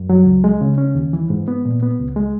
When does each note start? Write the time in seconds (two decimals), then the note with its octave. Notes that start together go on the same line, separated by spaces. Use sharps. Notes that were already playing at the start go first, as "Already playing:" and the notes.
Already playing: F#2
0.09 F#3
0.26 C#2
0.44 G#3
0.61 C#3
0.78 C#4
0.95 D#2
1.13 E3
1.30 G#2
1.48 B3
1.65 A#2
1.83 B3
1.99 C#2
2.16 G#3